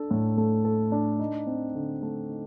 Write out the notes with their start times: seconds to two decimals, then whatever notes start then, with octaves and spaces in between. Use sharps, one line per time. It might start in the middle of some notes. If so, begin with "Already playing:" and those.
Already playing: D4 A4
0.11 A2
0.37 A3
0.65 A4
0.92 D4
1.19 D#4
1.47 C4
1.75 D3
2.02 A3
2.29 D#4